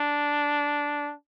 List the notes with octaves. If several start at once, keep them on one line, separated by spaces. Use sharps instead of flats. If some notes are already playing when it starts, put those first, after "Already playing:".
Already playing: D4